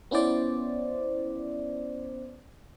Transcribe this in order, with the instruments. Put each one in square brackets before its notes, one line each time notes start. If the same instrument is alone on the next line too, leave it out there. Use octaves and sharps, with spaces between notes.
[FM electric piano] B3 C#4 E4 C5 D5